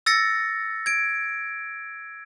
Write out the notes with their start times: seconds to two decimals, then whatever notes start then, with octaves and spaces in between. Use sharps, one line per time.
0.06 E6 A6 A#6 C#7
0.86 G#6 D7